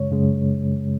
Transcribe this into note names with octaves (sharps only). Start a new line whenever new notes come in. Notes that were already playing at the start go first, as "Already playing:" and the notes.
Already playing: F#2 C#3 G#3 C#5
F#2 C#3 G#3